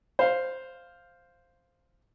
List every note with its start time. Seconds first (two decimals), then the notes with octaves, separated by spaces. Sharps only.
0.19 C5 F5